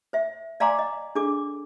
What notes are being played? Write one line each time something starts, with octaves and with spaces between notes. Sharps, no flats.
C5 E5
D5 F5 G#5 A#5 C6 D6
D#5
D4 G#4 A4 D6